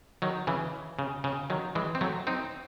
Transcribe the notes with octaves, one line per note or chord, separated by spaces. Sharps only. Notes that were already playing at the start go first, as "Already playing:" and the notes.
D#3 F#3
C#3 E3
C#3
C#3
D#3 F#3
E3 G#3
C4
F#3 A3
C4 D#4